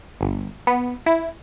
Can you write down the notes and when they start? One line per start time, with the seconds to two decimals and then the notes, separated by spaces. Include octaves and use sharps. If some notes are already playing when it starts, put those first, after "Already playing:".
0.21 G1
0.67 B3
1.06 E4